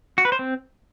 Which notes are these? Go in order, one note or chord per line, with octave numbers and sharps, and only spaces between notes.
F#4
B4
C5
C4